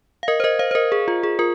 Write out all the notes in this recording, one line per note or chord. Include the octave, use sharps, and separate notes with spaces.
F5
A#4 D#5
C5
A#4 D#5
C5 F5
C5
A#4 D#5
G#4
F4
G#4
F4 A#4